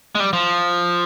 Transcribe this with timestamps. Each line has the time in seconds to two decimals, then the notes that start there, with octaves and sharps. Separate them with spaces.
0.15 G#3
0.20 G3
0.33 F3